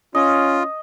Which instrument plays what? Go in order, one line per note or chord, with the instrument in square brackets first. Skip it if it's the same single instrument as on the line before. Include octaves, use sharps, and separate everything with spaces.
[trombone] C#4 [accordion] F4 [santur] D#5